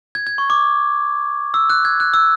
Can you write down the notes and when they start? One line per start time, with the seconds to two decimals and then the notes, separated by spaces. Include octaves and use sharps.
0.15 G#6
0.27 G#6
0.38 C#6
0.50 D6
1.54 E6
1.70 F#6
1.85 G#6
2.00 F#6
2.14 E6